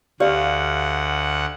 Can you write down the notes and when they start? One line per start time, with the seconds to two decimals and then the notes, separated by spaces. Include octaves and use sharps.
0.20 D2 G4 D5 F5 F#5